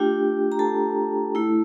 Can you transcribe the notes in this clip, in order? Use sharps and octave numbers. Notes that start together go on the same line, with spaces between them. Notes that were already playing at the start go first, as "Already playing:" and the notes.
Already playing: A3 D4 F4 G4 G5
A#5
A4 A5
A3 E4